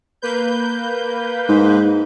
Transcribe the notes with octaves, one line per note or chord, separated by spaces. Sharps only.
A#3 B4 G6
G#2